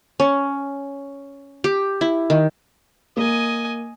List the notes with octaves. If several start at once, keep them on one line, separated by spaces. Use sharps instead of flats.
C#4
G4
E4
D#3
A#3 D#5 G#5